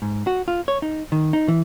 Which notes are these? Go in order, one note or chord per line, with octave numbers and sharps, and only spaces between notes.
G#2
F#4
F4
C#5
D#4
D#3
D#4
E3